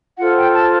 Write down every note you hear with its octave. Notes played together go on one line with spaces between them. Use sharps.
F4 A4 C5 F#5
G5
A5